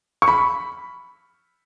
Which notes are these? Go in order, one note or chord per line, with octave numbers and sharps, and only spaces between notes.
C#6
B5